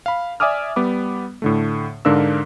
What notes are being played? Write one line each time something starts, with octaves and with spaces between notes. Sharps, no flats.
F5 B5
D5 E5 G#5 D6 D#6 F6
G3 B3 D6
A2 D3 A3
G#2 D3 D4 A#4 F5 E6